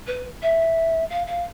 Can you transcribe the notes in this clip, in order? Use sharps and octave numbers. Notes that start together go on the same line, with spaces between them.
B4
E5
F5
F5